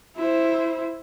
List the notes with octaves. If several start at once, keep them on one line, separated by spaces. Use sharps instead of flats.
E4 C5